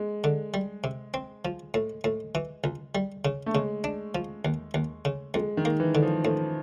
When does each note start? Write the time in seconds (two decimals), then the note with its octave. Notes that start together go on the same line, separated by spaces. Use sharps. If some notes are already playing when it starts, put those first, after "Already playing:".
Already playing: G#3
0.24 D3
0.54 G3
0.84 C3
1.14 C4
1.45 F3
1.74 A2
2.04 A2
2.35 E3
2.64 C#2
2.95 G3
3.25 C#3
3.46 A3
3.54 C#3 G#3
3.84 D4
4.15 F3
4.45 D#2
4.74 D#2
5.05 C#3
5.34 F2 G#3
5.57 D#3
5.65 A#3
5.80 E3
5.95 D3
6.02 F3
6.24 A2 F3